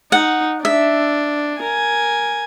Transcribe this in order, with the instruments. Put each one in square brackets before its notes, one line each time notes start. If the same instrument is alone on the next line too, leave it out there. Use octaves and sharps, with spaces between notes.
[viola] D#4 [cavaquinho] F#5
[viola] D4 [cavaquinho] E5
[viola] A#4 G#5